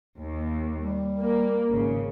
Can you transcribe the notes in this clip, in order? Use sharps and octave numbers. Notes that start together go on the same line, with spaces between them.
D#2
G3
A#3
G#1 C#3